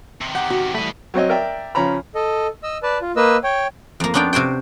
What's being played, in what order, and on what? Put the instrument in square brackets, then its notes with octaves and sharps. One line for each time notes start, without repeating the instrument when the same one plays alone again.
[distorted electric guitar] C3 D#3
[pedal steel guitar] G4 [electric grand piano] F#5
[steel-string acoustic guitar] F#4
[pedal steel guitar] E3 G3 A3 [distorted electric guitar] B4 D#5
[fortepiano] F#3 C4 C#5 D#5
A#4 D5 E5 G5
C#3 F3 C#5 A#5 B5
[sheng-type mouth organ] A4 D#5
D#5 E6
B4 D5 A5
F4
A#3 B4 D#5 E6
C#5 G5
[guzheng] F2 A#3
B3 C#4 D4 F4 G5
C3 F#4 C5 G5